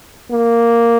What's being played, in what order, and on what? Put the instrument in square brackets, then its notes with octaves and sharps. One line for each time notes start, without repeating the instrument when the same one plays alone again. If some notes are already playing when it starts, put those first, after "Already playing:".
[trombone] A#3